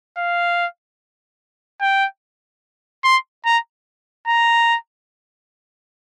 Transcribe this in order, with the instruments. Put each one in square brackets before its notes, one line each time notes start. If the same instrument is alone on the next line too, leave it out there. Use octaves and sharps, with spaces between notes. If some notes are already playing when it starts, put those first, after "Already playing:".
[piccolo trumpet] F5
G5
C6
A#5
A#5